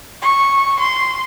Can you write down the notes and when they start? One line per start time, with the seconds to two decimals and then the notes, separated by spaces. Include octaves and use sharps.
0.22 C#6
0.80 C6